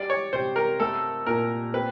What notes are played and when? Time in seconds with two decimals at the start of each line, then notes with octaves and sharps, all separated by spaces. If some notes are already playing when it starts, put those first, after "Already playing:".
Already playing: G3 D5
0.10 C#5
0.33 C3 C5
0.56 A#4
0.80 A3 A4
1.26 A#2 A#4
1.74 C4 B4